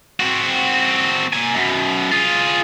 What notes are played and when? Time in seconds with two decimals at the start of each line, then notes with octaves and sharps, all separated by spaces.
0.20 C4 F#4
1.33 A#3 G#5
1.55 F#2 B2
2.11 F4 G#4